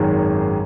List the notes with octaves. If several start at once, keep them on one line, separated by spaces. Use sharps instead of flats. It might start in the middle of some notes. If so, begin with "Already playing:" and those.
Already playing: G#1 F#2 D#3 G#3